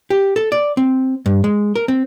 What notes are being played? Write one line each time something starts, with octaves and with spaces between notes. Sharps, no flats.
G4
A4
D5
C4
G2
G#3
A#4
C4